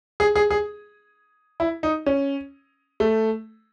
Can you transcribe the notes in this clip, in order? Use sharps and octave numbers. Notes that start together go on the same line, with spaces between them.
G#4
G#4
G#4
E4
D#4
C#4
A3